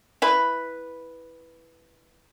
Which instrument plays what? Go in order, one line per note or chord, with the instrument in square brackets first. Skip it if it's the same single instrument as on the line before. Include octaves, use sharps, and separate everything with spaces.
[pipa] E4 B4